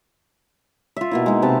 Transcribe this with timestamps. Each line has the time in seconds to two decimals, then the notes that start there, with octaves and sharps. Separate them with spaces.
0.96 F4 E5
1.11 B2 A#3 E4
1.26 G#3 D#4
1.42 C3 B4 A5